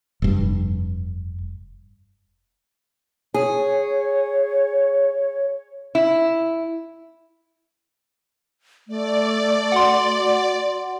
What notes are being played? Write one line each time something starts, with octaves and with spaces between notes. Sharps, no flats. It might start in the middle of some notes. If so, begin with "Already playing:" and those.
F1 G2
G#4 C#5
E4
A3 D5
F#4 F#5 C6